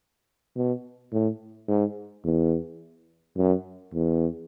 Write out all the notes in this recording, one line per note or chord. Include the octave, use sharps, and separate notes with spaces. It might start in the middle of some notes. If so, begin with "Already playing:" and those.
B2
A2
G#2
E2
F#2
E2